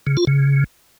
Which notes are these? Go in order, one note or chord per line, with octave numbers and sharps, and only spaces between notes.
C#3
F4
C#3